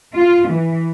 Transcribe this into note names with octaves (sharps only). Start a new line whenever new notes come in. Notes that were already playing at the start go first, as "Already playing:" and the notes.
F4
E3